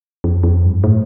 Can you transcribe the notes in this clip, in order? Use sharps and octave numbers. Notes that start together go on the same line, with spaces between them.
F2
F2
G2
A2